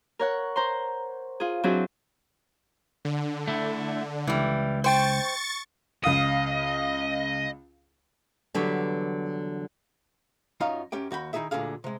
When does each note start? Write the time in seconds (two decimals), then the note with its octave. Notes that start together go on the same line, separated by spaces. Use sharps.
0.19 A#4 C#5 F#5
0.56 C5 A#5 C6
1.40 F4 G#4
1.63 F#3 C4 D4 E4 F#4 G#4
3.05 D3
3.48 A3 E4
4.27 C#2 E3 G3
4.84 C5 G5 C#6 A6
6.04 C#2 D#5 F5 D#6
8.54 E2 D3 F#3 G3 B4
10.60 F#2 D#4 F4 C#5 F5 A#5
10.92 F#2 C#4 G4 G5
11.11 D#2 F#4 G5 B5
11.33 D#3 D#4 E4 G#4 E5
11.51 D2 A#2 D3 G#4 F5
11.84 C3 G#3